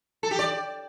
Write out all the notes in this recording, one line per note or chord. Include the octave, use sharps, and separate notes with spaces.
A4
G4
D5